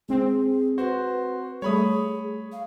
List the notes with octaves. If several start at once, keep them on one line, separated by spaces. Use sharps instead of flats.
G#3 C4 G#4
F#4 B4 C5
G3 A3 G#4 C#5 B5 D#6
F5